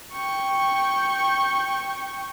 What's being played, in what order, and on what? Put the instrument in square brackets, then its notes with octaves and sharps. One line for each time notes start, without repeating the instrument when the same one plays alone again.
[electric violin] G5 C#6